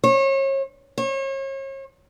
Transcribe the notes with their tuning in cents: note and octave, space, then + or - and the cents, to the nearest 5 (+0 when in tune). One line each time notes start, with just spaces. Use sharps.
C#5 -35
C#5 -40